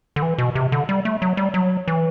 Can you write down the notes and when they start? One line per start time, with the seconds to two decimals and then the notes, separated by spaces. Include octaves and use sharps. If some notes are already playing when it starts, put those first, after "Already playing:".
0.16 D3
0.22 E3
0.38 B2
0.55 C3
0.72 D3
0.89 G3
1.05 A3
1.22 F#3
1.37 G3
1.54 F#3
1.88 E3